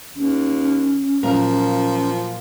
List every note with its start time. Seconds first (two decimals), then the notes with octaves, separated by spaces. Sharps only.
0.15 D#2 C#4
1.23 A#2 F3 F#3 A#4